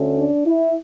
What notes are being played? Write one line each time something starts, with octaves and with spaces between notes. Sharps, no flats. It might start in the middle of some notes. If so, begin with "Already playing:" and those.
Already playing: D2 D3 A3 C#4
D4
E4